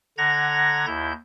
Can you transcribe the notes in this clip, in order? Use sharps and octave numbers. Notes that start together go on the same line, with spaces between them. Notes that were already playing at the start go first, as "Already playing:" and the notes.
D3 F#5 A#5 G#6 A#6
D#2 E4 G6